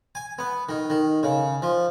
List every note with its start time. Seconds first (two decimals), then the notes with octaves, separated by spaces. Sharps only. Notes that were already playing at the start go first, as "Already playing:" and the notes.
0.15 G#5
0.39 B3
0.69 D#3
0.90 D#3
1.23 C#3
1.62 F3